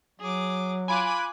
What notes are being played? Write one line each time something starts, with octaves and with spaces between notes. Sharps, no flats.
F#3 G#4 D6
F4 G#5 B5 D6 F#6